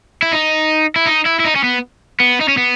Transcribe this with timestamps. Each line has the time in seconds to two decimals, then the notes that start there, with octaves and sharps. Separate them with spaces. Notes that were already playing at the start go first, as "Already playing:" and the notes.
0.22 E4
0.32 D#4
0.96 E4
1.07 D#4
1.26 E4
1.39 E4
1.45 D#4
1.55 C#4
1.64 B3
2.20 B3
2.41 D#4
2.49 C#4
2.57 B3